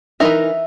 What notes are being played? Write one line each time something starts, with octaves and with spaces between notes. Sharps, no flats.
E3 G#3 D#4 A#4 E5